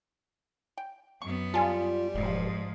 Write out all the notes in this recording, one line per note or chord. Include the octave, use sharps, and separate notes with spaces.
G5
F#2 B3 C#6
G3 F4 G#5 A5
E1 G#2 F3